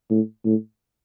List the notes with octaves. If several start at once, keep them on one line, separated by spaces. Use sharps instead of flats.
A2
A2